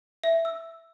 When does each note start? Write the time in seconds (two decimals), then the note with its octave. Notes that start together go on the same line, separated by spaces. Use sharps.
0.24 E5
0.45 E6